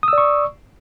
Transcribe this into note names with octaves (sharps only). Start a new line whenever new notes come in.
D5 C#6 D#6 E6